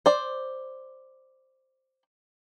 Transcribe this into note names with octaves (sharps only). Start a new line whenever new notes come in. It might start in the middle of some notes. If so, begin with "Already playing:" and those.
C5 D5